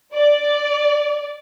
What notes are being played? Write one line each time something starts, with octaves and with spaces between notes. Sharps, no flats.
D5